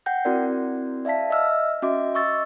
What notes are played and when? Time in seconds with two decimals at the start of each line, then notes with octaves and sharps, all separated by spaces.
0.06 F#5 G5 G6 A#6
0.25 C4 E4 F#4 A#4 D5
1.05 D5 E5 F5 A5 B6
1.30 D#5 E5 E6 F6
1.82 C#4 F#4 D#5 E5 D6
2.15 D#5 C#6 E6 A6